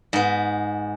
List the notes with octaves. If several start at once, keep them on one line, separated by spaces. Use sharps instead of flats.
G#2 B3